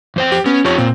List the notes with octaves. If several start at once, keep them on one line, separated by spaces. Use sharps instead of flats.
F2 C5 G5
G4
B3 C#4
F2 F4 G4 C#5
A#2 C4